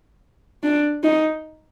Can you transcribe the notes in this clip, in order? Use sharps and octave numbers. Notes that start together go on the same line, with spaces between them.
D4
D#4